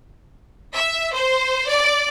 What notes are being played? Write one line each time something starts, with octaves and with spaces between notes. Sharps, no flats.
E5
C5
D5